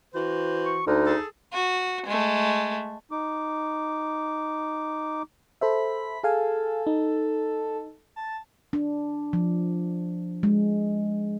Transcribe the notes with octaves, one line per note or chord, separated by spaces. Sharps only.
E3 F#4 C5
C#6
D2 D#4
G#4 A4
F#4
G#3 A3
D#4 D6
A4 C5 E5 B5
G#4 A4 F5 G#5
D#4
A5
D4
F3
G#3